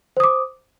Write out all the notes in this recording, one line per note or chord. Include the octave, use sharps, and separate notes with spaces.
C5 D6 D#6